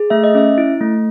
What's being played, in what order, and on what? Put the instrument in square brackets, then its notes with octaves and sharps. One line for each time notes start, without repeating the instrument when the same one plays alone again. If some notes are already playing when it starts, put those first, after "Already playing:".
Already playing: [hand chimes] G#4
A3 E5
D#5
C#4 E5
E4
A3